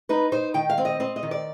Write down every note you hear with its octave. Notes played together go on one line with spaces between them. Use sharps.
D#4 B4
D#4 C5
D#3 G5
F5
C4
D#5
C4 D#5
D#5
D#3
D5